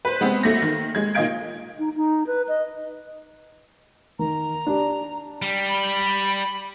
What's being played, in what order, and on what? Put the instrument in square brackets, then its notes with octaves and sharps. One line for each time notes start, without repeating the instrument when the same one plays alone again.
[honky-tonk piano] B4 C5
G#3 B3 C4
G#1 A3 A#6
D#3
G#3 G#6
A#2 D#3 D#5 F5 G#6 D7
[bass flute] D#4
D#4
B4
D#5
[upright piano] D#3 [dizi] A#5
[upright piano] D4 G4
[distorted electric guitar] G3
[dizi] B5